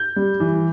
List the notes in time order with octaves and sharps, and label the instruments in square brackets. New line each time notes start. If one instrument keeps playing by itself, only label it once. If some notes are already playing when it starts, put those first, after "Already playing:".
Already playing: [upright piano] G6
G3
E3